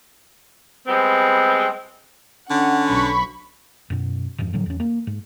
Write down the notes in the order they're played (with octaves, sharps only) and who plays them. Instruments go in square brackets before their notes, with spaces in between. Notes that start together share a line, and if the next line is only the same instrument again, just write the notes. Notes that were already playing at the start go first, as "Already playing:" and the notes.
[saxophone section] G3 G#3 B3 C4
[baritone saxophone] D3 [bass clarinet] C#4 [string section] F#5
[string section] B1 B5 C#6
[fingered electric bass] F#2 B2
F2 G#2 F3
A2 D3 F3 F#3
E2 C#4
A#3
G#2